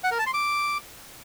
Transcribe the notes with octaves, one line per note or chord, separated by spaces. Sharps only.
F#5
A#4
A5
C6
D6